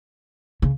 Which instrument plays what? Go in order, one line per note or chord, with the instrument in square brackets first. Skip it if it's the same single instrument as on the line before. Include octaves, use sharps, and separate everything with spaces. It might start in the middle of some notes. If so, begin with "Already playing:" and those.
[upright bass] C#3